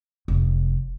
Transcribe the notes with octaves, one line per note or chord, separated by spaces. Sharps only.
F1